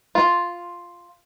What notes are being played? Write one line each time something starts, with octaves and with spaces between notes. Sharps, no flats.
F4